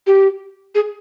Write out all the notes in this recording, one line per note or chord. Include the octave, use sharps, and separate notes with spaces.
G4
G#4